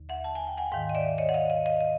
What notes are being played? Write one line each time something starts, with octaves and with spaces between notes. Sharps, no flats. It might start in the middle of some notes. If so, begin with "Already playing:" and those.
Already playing: D#2 D3
E5 F#5
A5
G#5
G5
F#5 G#5
G#2 D#3 F5 G5
D#5
D5 E5
C#5 D#5
F#5
D#5 F5
D#5 F5
D#5 F5
D#5